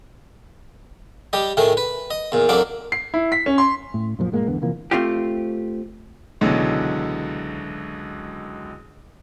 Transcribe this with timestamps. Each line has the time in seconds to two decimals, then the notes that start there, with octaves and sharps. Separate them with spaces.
1.33 G3 G4 D#5
1.57 A2 D#3 A3 G#4
1.77 B4
2.11 D#5
2.32 E2 A#2
2.49 F2 F#3 A#3 D4 D6
2.92 C7
3.14 E4
3.32 B6
3.46 C#4
3.58 C6
3.94 A2
4.19 F#2 A#2 F3
4.32 G2 A#2 G#3 A#3
4.47 G1 E2 D3 B3
4.61 C3 E3 F3 A#3
4.91 A3 C4 F4 G4
6.41 C#2 B2 D3 E3 F#3